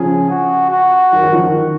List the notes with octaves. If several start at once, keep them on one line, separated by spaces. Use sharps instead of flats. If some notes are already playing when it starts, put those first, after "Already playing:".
Already playing: C#3 F3 G#4
F#4
F#4
D#3 F#3
D#3 F#3
C#3 F3
D#3